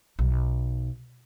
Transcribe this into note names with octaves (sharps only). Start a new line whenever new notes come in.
B1